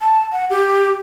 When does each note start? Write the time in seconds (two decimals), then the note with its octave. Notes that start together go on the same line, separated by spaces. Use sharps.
0.01 A5
0.32 F#5
0.50 G4